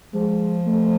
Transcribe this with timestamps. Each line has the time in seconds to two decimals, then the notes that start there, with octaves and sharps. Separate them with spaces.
0.13 F3 G#3
0.67 A3